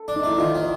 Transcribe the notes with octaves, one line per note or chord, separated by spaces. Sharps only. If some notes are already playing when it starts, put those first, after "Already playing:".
Already playing: A4
D4
D#4
A3 E4
D#3 F4
D#3